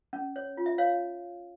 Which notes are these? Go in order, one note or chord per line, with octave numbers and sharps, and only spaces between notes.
C#4
C#5
F4
E5
C#5 F5